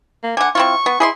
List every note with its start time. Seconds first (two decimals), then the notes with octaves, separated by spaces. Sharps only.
0.24 A#3
0.37 D3 F#5 G#5
0.55 C4 E4 F4 C#6
0.86 B3
1.00 E4 G#4 D#5 C6